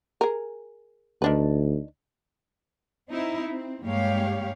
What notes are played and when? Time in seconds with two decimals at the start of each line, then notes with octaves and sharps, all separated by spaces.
0.21 G#4 A#4
1.22 D2 D#3 D4 B4
3.09 C4 D#4 E4
3.49 C4
3.83 G2 G#3 A#3 G4 C#5 F5